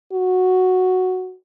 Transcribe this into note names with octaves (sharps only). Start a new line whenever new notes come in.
F#4